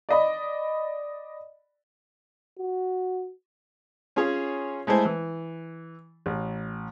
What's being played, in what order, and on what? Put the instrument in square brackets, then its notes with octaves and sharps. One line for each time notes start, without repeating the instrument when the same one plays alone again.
[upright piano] D5 D#5 B5
[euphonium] F#4
[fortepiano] C#4 F4 G#4 C#5
G#3 A3 E4 C5 G#5
E3
A1